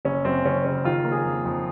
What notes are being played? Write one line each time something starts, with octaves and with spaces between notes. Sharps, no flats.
F#1 C#4
F#2 C4
F#1 C#4
C#3 C#4
D#3 F4
A#3
G#4
F2
F2